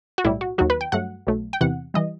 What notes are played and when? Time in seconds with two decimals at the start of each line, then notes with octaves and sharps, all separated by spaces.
0.18 F#4
0.24 B1 A2 G3 E4
0.41 F#4
0.58 D#2 D#3 F#3 F#4
0.70 B4
0.81 G5
0.92 G2 F#3 A3 F#5
1.27 B1 B2 F#3 A3
1.53 G5
1.61 E2 C3 E3 F#5
1.94 E3 G3 D#5